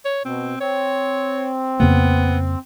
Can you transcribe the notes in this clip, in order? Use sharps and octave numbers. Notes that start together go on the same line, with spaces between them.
C#5
B2 C4
C4 C#5
F2 C#3 A#3 B3